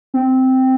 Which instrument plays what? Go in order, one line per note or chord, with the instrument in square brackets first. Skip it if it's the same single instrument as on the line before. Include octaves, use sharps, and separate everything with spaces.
[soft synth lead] C4